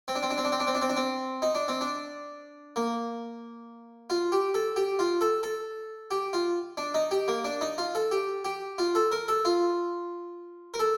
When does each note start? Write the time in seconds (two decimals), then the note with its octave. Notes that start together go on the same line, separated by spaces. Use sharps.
0.08 C4
0.15 D4
0.23 C4
0.30 D4
0.38 C4
0.45 D4
0.52 C4
0.60 D4
0.67 C4
0.75 D4
0.82 C4
0.89 D4
0.97 C4
1.42 D#4
1.55 D4
1.68 C4
1.81 D4
2.76 A#3
4.10 F4
4.32 G4
4.54 A4
4.76 G4
4.99 F4
5.21 A4
5.43 A4
6.11 G4
6.33 F4
6.77 D4
6.94 D#4
7.11 G4
7.28 A#3
7.45 D4
7.61 D#4
7.78 F4
7.95 A4
8.11 G4
8.45 G4
8.78 F4
8.95 A4
9.12 A#4
9.28 A4
9.45 F4
10.74 A#4
10.79 A4